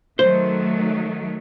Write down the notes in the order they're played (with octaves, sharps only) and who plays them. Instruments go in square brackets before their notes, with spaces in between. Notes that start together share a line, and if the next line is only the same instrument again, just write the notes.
[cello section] D#3 F#3 A3 [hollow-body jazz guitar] C5